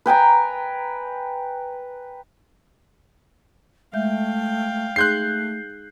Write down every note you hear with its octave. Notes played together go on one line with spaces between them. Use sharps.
B4 G5 G#5 A#5
G#3 A3 E5 F5 G5 G6
A3 D#4 G#4 C6 F#6 G6 C7